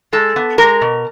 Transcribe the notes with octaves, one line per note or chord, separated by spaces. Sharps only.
G#3 A4
B3
G#3 A#4
B2